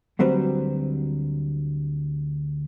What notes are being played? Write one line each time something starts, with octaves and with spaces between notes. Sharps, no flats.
D2 F#3 G3 C4 B4